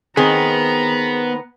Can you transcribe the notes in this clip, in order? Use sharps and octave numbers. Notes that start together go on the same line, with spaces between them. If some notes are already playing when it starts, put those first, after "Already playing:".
D#3 B3 C4 G#4 A#5